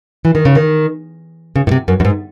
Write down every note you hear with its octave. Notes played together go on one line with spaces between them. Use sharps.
E3
D#3
C#3
D#3
C#3
A2
C3
F#2
F#2
G#2